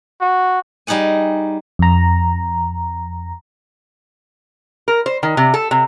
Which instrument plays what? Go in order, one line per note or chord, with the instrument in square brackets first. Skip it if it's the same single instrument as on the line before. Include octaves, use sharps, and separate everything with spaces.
[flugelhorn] F#4
[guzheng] G3 D#4 G#4 F#5 G#5
[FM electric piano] F2 A#5
[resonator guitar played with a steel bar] A#4
C5
D#3
C3
A4
C3